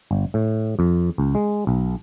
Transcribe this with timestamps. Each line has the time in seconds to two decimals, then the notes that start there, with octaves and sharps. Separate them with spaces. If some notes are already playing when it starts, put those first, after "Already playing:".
0.11 G1
0.34 A2
0.79 F2
1.18 C#2
1.35 G#3
1.67 B1